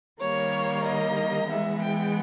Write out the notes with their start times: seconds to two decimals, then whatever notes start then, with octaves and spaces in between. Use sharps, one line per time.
0.21 D#3 G3 A#3 C#5
0.86 D#5
1.50 E3 G#3 B3 E5
1.82 G5